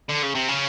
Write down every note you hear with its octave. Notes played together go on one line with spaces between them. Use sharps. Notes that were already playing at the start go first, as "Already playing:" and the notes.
D3
C#3
C3
C#3